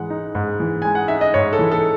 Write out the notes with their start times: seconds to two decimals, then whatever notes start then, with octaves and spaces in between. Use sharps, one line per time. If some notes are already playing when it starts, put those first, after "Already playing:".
Already playing: G#2 E3 G#3 F#5
0.10 D#4
0.35 G#2
0.60 E3
0.82 G#3 G#5
0.95 F#5
1.08 D#4 E5
1.21 D#5
1.34 G#2 C#5
1.53 A4
1.59 E3
1.71 A4